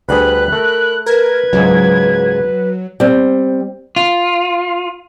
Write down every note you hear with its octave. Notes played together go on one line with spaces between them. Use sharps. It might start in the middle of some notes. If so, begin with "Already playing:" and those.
D2 G3 G#4 B4 B5 F#6
A3 A#4
A#4 B4 G#6
C#2 G#2 F#3
G3 C4
F4